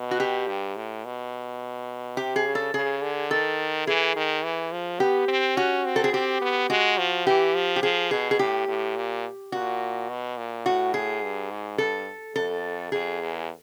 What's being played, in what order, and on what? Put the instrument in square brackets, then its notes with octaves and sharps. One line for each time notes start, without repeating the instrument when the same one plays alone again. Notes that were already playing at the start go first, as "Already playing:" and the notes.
Already playing: [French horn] B2
[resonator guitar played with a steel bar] F#4
G4
[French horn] G2
A2
B2
[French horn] C3 [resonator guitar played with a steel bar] G4
[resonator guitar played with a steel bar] G#4
[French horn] C#3
[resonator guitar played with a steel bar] A4
[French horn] C#3 [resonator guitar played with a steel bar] G#4
[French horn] D3
[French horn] D#3 [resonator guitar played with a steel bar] A4
[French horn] E3 [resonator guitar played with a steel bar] G#4
[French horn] D#3
E3
F3
[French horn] B3 [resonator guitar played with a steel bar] G4
[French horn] C4
[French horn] C#4 [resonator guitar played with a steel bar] F#4
[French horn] C4
[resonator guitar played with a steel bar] A4
G#4
[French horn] C4 [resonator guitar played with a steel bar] G4
[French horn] B3
[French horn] G#3 [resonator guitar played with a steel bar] F#4
[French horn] F3
[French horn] E3 [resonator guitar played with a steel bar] G4
[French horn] F3
[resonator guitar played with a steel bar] G4
[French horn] F3 [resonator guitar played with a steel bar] G#4
[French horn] B2 [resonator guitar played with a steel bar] G#4
[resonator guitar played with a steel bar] G#4
[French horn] A2 [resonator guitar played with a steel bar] G4
[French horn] A2
A#2
[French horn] A#2 [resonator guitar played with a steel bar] F#4
[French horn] B2
A#2
[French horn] A2 [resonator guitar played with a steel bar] F#4
[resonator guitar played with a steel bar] G#4
[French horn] G2
G#2
[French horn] G2 [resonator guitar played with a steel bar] A4
[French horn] F2 [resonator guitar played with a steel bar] A4
[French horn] F2 [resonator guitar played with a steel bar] G#4
[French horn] E2